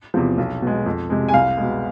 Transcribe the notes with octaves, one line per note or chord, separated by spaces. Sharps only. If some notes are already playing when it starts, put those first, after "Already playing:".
E2 C3 F3
B1
B2 G#3
F2
C3 G#3
G#5
C2 F5
B2 G#3